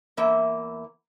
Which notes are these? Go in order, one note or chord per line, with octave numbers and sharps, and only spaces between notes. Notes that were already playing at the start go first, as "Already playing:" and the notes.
E2 E3 A#3 E5